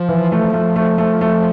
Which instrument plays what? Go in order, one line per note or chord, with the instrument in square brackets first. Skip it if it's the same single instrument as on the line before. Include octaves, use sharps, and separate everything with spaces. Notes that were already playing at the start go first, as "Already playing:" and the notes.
Already playing: [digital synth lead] F3
[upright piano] E3
A3
A3
A3
A3
A3